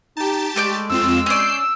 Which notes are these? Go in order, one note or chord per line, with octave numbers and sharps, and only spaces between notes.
D#4 G4 A5
G#3 A3 D5 G6
F2 C4 F4 E6
C#4 D5 G6 C7